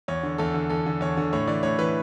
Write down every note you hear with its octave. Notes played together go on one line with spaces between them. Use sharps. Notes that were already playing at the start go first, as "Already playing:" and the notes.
E2 C#5
D3
E2 A4
D3
E2 A4
D3
E2 C#5
D3
A2 C#5
E3 D5
A2 C#5
E3 B4